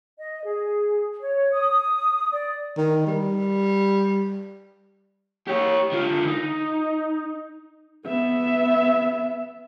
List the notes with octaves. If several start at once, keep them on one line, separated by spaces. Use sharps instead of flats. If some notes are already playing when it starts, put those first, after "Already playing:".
D#5
G#4
C#5
D#6
D5
D#3
G3
G4 C#5
D3 F4
D#4
B3 E5